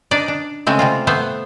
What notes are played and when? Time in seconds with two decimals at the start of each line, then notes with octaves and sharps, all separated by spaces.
0.11 D4 D#4 D5
0.28 D4
0.67 C#3 G#3 A3 C4
0.79 C3 G3 F4
1.07 A3 B3 C5